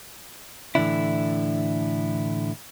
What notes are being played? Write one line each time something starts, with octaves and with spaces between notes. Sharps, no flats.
A2 D3 E3 F#3 D4 E4